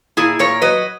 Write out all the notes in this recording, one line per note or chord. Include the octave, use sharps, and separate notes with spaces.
A#2 E4 G#4
A#2 A#4 C#5
F#3 B4 D#5